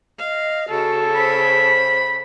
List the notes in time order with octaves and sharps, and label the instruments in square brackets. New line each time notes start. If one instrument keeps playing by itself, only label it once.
[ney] D#5 [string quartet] F5
[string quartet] C#3 [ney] F#4 [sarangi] A4
[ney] C5 [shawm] B5